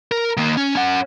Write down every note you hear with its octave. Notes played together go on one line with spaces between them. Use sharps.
A#4
D#3 A#3
C#4
C#4 F#5